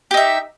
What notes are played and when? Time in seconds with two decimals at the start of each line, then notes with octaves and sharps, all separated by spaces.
0.11 G4
0.14 D#4
0.17 E5